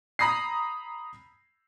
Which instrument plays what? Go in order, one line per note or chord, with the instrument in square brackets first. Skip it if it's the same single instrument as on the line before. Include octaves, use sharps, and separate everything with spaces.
[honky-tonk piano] A#5 B5 D#6 A#6 C7